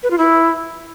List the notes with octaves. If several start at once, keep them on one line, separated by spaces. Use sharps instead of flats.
B4
F4
E4